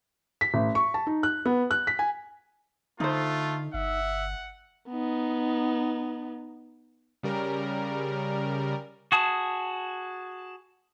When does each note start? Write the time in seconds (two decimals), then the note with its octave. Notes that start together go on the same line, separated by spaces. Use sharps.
0.41 B6
0.54 A1
0.75 C#6
0.94 A5
1.07 D#4
1.23 F#6
1.46 B3
1.71 F#6
1.87 B6
1.99 G#5
3.00 D3 A3 D#4 F4 C5
3.74 G1 E5 F#5
4.90 B3 D#4
7.23 C#3 G3 A#4
9.12 F#4 G#4 A5